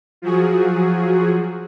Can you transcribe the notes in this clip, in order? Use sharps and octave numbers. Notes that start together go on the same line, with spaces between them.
F3 F#3 F#4 G#4